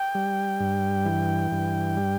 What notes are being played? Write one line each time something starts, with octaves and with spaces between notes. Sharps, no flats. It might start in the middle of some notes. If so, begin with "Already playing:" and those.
Already playing: G5
G3
G2
E3
G2
G3